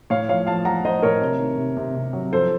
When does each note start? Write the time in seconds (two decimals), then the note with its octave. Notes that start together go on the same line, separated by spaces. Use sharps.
0.10 A2 C#5 F5
0.29 F3 C#5 F5
0.47 F3 F5 A5
0.65 F3 F#5 A#5
0.84 F3 C5 D#5
1.03 A2 A#4 C#5
1.21 C3
1.39 D#3
1.58 C3
1.77 C3
1.96 C3
2.13 F#3
2.32 F3 A4 C5